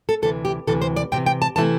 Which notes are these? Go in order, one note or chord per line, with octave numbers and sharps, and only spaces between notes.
A4
D2 C3 E3 A4
G4
D2 C3 E3 A4
C5
D5
D2 C3 E3 G5
G5
A5
C3 E3 A3 E4 A5